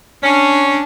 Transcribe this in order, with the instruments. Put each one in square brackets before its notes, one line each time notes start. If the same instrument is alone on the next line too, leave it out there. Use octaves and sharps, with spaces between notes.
[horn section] C#4 [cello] D4